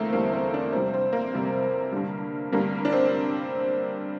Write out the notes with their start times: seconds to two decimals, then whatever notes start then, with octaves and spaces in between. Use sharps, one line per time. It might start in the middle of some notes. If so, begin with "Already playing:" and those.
Already playing: E2 D3 A3 A#3 C4
0.13 E2 D3 G3 A#3
0.33 C4
0.54 D4
0.72 F2 C3 G3 C4
0.94 C4
1.13 A#3
1.33 F2 C3 G3
1.92 G2 D3 G3
2.52 G2 D3 G3 A#3
2.85 D4
2.93 C4